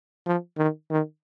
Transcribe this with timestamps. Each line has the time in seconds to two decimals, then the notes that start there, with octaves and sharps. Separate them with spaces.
0.26 F3
0.58 D#3
0.90 D#3